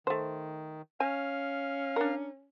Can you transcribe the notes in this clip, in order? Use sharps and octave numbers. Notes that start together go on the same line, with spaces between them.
D#3 A3 C5
C#4 F5 G#5
D4 A#4